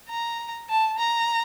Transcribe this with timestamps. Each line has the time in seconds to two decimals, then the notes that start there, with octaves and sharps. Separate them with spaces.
0.09 A#5
0.69 A5
0.99 A#5